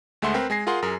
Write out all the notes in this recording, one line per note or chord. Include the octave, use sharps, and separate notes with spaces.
D2 G#3 A3 E5 F#5 C6
C4 A#4 B4 G5 C6
G#3 G#5 A#6 C7
F4 G#4 A#4 F#5 C6
F#2 G#4 A#4